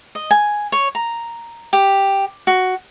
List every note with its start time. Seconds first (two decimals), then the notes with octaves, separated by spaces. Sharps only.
0.15 D#5
0.31 G#5
0.72 C#5
0.95 A#5
1.73 G4
2.47 F#4